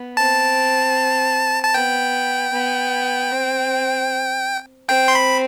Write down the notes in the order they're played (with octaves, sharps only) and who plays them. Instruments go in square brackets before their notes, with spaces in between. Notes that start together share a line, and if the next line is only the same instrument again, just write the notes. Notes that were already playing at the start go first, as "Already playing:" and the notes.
Already playing: [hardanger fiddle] B3
[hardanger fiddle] C4 [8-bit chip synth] A5
[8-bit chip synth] A5
[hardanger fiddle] B3 [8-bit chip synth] G5
[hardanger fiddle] B3
C4
[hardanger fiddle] C4 [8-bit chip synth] G5
[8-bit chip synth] C6
B5